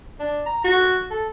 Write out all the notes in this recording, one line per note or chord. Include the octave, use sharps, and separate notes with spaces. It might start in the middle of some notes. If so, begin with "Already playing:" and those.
D4
A#5
F#4
A4